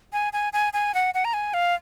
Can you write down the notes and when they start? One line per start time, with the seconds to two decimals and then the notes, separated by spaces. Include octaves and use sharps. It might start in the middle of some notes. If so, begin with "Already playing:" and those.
0.13 G#5
0.33 G#5
0.53 G#5
0.73 G#5
0.94 F#5
1.14 F#5
1.25 A#5
1.34 G#5
1.54 F5